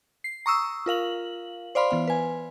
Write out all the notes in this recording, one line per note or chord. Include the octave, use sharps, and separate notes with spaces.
C7
A#5 C#6 D#6 E6
F4 A#4 F5 F#7
C5 D5 F5 B5 C6
E3 B3 F5
B4 G#5